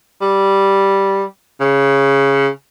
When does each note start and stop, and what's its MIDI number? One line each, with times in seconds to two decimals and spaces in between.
0.22 1.24 55
1.60 2.48 49